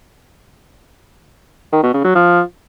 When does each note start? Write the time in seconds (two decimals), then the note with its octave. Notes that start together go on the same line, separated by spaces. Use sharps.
1.73 D#3
1.83 B2
1.94 C#3
2.04 F#3
2.15 F3